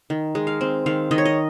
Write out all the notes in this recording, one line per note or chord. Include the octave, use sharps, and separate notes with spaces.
D#3
G#3
F5
C4
D#3 F5
D#3 D#5
C#5
D#5